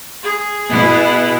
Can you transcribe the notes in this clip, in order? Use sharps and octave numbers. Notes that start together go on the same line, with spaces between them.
G#4
B2 B3 E4